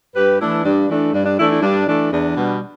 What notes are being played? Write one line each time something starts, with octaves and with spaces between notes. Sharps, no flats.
G2 G4 B4
E3 A3 D4 E4
G2 D4
E3 A3 D4
G2 D4
D4
E3 A3 D4 E4
E4
G2 D4
E3 A3 D4
E2 D4
B2 G3 B3